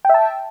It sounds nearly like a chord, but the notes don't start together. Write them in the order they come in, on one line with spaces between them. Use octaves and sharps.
G5 E5 A5